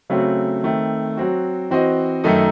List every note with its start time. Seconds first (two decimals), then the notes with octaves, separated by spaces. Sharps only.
0.10 C#3 F#3 A3 C4 F#4
0.63 D#3 A3 C4
1.17 F#3 C4 F#4
1.70 E3 C4 F#4 C5 D#5
2.24 F#2 D#3 A3 D#4 A4